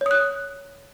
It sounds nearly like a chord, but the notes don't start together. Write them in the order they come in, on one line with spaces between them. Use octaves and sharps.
C#5 D#6 F#6